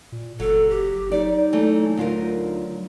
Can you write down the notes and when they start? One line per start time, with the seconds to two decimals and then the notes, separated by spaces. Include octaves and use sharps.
0.12 A#2
0.40 F#1 F#3 A4
0.69 G4
1.12 F#3 D#4 D5
1.53 E3 A3
1.97 D2 F4 A#4